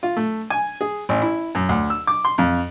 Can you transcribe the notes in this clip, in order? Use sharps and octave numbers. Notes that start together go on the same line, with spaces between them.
F4
A3
G#5
G#4
A1
E4
F#2
D2
E6
D6
C6
F2